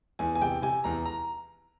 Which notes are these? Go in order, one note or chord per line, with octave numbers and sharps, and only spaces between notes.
E2 G#5
G#5
C3 G5
C3 G#5
E2 A#5
A#5